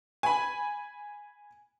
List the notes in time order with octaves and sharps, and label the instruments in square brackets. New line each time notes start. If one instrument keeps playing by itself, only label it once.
[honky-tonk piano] G#5 B5